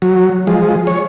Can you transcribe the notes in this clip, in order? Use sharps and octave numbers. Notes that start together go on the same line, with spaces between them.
F#3
F3 G#3
C#5